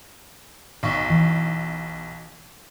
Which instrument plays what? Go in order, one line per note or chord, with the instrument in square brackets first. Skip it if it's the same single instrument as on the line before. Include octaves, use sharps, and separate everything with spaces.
[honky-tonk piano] B1 C#6
[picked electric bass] E3